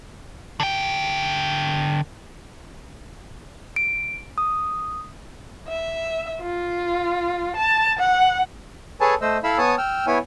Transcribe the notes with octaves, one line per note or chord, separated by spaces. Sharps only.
D3 G5
D7
D#6
E5
F4
A5
F#5
G#4 A4 B4 C#5 G#5 A5
A3 C5 D#5 E6
E4 A4 E5 F5 B5 E6
B3 C#5 G#5 A5 D#6
G5 E6 F6
B3 E4 C#5 G#5